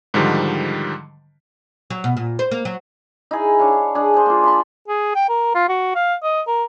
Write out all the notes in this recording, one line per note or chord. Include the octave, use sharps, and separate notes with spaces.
G#2 D3 D#3 F3 G3
F#3
B2
A#2
C5
A#3
F#3
D#4 E4 G#4
D4 C#5 F5 A5
D4 G#4
G#4 C5
A#3 F4
A5 B5 C6
G#4
G5
A#4
F4
F#4
F5
D#5
A#4